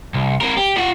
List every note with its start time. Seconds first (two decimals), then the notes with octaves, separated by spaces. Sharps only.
0.14 C2
0.41 C4 A#4
0.57 G4
0.77 F4 F#5